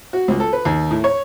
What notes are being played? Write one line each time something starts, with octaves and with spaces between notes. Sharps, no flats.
F#4
C#2
A4
B4
D#2
A2
C#5